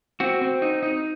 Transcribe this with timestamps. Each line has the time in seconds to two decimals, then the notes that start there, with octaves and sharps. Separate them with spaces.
0.20 C4 F#4
0.41 C4
0.62 D#4
0.83 D#4